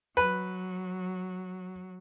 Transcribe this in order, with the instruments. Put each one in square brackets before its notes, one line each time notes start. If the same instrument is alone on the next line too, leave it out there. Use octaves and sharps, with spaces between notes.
[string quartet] F#3 [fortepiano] B4